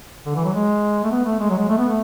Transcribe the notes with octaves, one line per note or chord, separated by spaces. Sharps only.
D3
E3
F#3
G#3
A3
B3
A3
G#3
F#3
G#3
A3
B3
A3